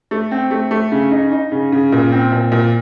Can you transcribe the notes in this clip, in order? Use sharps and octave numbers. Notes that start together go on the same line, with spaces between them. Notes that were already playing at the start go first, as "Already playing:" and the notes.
A3
C4
A3
A3
C#3
D#4
D#4
C#3
C#3
A#2
C4
A#2
A#2